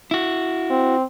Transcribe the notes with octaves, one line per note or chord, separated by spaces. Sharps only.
E4 F#4
C4